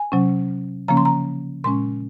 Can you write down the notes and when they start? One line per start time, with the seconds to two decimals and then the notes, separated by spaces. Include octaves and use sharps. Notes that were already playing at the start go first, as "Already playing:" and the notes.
Already playing: G#5
0.12 C3 F#3 C#4
0.88 C#3 F3 A#3 C#4 A#5
0.97 C6
1.05 A#5
1.64 A#2 G#3 C#4 C6